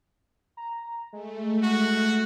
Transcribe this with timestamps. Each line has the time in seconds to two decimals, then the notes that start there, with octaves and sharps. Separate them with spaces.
0.57 A#5
1.13 G#3 A3
1.63 F#4